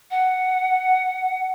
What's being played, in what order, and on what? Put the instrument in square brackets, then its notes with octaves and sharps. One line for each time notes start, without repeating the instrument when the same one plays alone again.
[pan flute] F#5